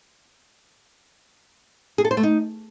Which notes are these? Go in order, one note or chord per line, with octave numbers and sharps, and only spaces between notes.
G#4
A4
C5
A3
D#4